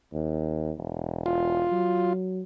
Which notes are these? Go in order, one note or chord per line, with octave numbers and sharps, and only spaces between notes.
D#2
E1
F4
F#3